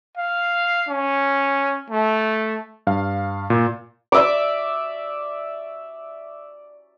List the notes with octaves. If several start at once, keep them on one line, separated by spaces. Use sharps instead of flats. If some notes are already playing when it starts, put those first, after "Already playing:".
F5
C#4
A3
G2 F5
A#2
D5 E5 D6